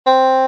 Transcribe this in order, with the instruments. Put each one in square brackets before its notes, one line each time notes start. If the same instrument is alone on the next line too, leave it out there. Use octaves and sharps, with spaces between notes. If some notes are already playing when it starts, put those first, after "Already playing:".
[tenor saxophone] C4